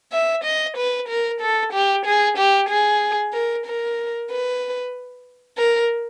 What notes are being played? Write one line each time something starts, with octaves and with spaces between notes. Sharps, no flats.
E5
D#5
B4
A#4
A4
G4
G#4
G4
G#4
A#4
A#4
B4
A#4